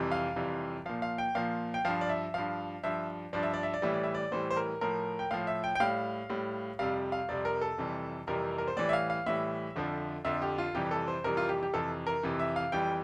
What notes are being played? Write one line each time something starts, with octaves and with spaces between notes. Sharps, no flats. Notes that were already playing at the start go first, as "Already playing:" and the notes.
Already playing: F2 C3 E3 G3
F5
F2 C3 E3 G3
A#2 F3 F5
F5
G5
A#2 F3 F5
G5
G2 F3 F5
D5
E5
G2 F3 F5
G2 F3 E5
G2 F3 D5
E5
D5
E5
D5
A2 E3 G3 E5
D5
E5
D5
A2 E3 G3 C5
C5
A#4
A2 F3 A#4
G5
A2 F3 F5
E5
G5
G5
A2 G3 F5
A2 G3
F2 C3 G3 F5
F5
F2 C3 G3 D5
A#4
A4
F2 C3 E3 G3
F2 C3 E3 G3 A#4
A#4
C5
A2 E3 G3 D5
E5
F5
F5
A2 E3 G3 E5
F2 D3 F3
F2 D3 F3 E5
G4
F4
F2 C3 E3 G3 G4
A4
C5
F2 C3 E3 G3 A#4
F4
G4
G4
F2 C3 E3 A4
A#4
F2 C3 E3
E5
F5
F2 E3 G3 G5